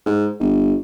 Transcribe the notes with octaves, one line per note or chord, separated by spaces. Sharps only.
G#2
G1